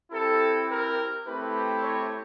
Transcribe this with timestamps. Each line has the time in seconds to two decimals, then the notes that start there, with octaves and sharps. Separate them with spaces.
0.11 C4 E4 G4 A4
0.68 A#4
1.24 A3 C4 E4 G4 B4
1.81 C#5